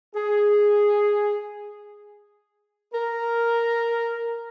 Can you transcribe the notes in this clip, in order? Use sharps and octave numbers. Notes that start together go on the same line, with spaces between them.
G#4
A#4